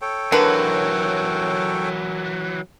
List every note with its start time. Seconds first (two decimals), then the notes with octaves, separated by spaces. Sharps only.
0.01 A4 C#5 G5
0.32 D3 E3 F#3 A#4 B4